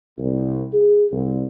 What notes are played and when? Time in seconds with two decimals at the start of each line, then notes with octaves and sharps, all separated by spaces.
0.17 C2
0.73 G#4
1.11 C2